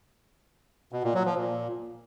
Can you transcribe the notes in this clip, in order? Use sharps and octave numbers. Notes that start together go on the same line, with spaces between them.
B2
A#2
F#3
F3
A#2